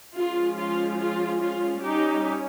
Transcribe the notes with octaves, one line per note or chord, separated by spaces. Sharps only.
F3 G#3 C#4 F4
F4
F4
F4
G3 C#4 D#4 G4